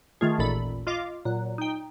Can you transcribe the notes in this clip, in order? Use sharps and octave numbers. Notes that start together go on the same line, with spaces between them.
D#3 A3 F4 G#4
A1 D#2 A#2 A4 B5
F4 D#5 F5 D6
A#2 F#3
D#4 G5